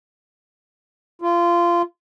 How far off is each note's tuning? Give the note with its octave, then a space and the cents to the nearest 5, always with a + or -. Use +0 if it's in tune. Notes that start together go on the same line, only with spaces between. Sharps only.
F4 -20